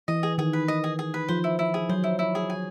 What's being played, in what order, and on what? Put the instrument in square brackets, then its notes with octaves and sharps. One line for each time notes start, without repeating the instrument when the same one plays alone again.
[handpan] E3 [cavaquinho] D#5
[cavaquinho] G#4
[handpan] D#3 [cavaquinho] G#4
[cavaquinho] B4
D#5
G#4
G#4
B4
[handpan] F3 [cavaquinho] C5
[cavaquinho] E4
E4
G#4
[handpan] F#3 [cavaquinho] C5
[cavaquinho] E4
E4
G#4
G#5